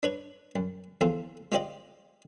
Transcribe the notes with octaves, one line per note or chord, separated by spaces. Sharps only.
D4 B4 C#5
F#2
E2 F3 F4 A4
G#3 F4 G4 C5 D5 D#5